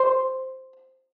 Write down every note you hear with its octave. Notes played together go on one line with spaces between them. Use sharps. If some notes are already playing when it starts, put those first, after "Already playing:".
Already playing: C5